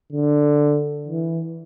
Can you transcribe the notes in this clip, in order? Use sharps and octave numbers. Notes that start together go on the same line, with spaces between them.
D3
E3